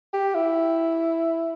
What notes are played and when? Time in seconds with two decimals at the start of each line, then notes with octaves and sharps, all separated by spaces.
0.13 G4
0.35 E4